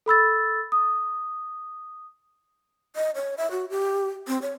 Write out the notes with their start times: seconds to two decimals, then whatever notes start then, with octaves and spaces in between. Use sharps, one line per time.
0.06 A4 B5 E6 A6
0.72 D#6
2.96 D#5
3.15 C#5
3.38 E5
3.51 F#4
3.70 G4
4.28 C4
4.42 C#5